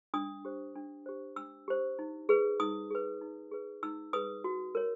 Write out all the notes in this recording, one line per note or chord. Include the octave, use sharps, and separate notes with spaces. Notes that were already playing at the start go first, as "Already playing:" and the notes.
D4 D#6
G4 C5
D4
G4 C5
D4 E6
G4 C5
D#4
G#4 B4
D#4 D#6
G#4 B4
D#4
G#4 B4
D#4 E6
G#4 B4 D#6
F#4
A#4 C#5